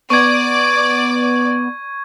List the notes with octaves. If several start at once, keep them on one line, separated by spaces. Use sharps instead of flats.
B3 D5 C#6 G#6